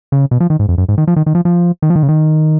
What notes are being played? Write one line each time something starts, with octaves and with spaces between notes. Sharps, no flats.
C#3
B2
F3
D#3
G#2
F2
F#2
G#2
D#3
F3
D#3
D#3
F3
F3
D#3
F3
D#3
C#3
D#3